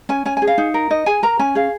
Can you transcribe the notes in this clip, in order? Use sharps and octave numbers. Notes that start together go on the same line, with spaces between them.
C#4 G#5
C#4 G#5
G#5
G#4
F5
D#4
A#4
D#4 D#5
G#4 G#5
A#4 A#5
C#4 G#5
G#4 F5